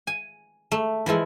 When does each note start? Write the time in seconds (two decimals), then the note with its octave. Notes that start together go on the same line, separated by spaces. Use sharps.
0.07 G#5
0.72 A3
1.06 E3 F3 G#3 E4